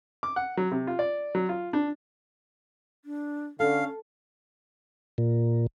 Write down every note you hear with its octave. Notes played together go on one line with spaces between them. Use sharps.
D6
F#5
F#3
C3
F4
D5
F#3
F4
D4
D4
D3 C#4 A4 F5
A#2